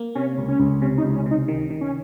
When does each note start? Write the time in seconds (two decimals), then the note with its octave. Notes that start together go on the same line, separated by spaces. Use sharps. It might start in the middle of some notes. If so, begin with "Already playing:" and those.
Already playing: A#3
0.15 C3 C#4
0.38 C#2
0.49 C#4
0.60 C#2
0.81 C3 C#4
0.98 D#4
1.04 C#2
1.15 C#4
1.26 C3
1.31 D#4
1.48 D#3
1.70 D#3
1.81 C#4